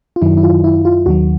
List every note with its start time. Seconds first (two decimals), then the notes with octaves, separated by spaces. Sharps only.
0.16 F4
0.22 F#2 D#3 F#3 E4
0.37 E4
0.43 F4
0.64 E4
0.85 F4
1.06 D#2 D#3 F#3 F#4